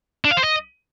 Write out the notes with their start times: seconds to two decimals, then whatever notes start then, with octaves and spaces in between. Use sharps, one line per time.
0.25 D4
0.31 F5
0.37 C5
0.43 D#5